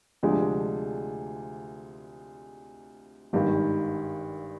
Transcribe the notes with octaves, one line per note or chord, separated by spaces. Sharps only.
D2 C3 F3 G#3 D4
G#1 G2 D#3